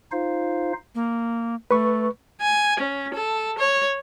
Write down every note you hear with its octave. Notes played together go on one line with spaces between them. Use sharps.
D#4 F4 C5 F5
A#3
A3 B4 C#6
G#5
C#4
A4
C#5